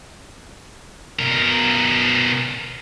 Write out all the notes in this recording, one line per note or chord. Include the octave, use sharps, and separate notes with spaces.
B2 A#4